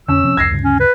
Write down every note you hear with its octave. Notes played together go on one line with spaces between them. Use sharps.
F2 D3 C#4 E6
C3 F3 C4
C2 F2 G#6 A#6 C7
D2 G2 C#3
C#4
B4